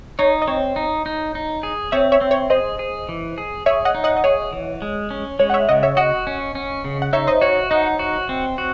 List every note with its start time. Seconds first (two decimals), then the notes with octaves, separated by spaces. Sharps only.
0.19 D#4 C#5
0.42 D#5
0.48 C4 C#5
0.76 D#4
1.06 D#4
1.35 D#4
1.63 G#4
1.92 C4 C#5 E5
2.12 C#5 E5
2.21 C4
2.31 C#5
2.50 G#4 C5 D#5
2.79 G#4
3.09 E3
3.38 G#4
3.66 G#4 C#5 E5
3.85 D#5 F#5
3.95 D#4
4.04 D#5 F#5
4.17 D#5
4.24 G#4 C#5
4.53 E3
4.82 G#3
5.11 C#4
5.39 G#3 C#5
5.50 F#5
5.54 C#5 E5
5.69 C#3 D#5 F#5
5.83 C#5 E5
5.97 F#4 D#5 F#5
6.27 C#4
6.55 C#4
6.85 C#3
7.02 F#5
7.13 D#4 C#5 E5
7.27 C5 D#5
7.41 F#4 C#5
7.71 D#4 D#5 F#5
7.99 F#4
8.29 C4
8.58 F#4